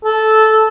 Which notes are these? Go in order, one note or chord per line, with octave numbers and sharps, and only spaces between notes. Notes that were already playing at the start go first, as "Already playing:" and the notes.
A4